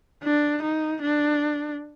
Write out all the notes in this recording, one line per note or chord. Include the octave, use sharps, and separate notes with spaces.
D4
D#4
D4